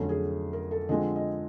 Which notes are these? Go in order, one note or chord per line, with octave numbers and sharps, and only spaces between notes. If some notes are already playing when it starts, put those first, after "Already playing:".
Already playing: F2 D3 F#3 A3 C#4
G#4
A#4
A4
D3 F3 G#3 C4 D#5
D#5